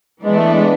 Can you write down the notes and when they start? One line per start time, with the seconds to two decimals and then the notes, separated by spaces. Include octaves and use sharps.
0.23 E3 G#3 B3 D4
0.38 A3
0.54 G#3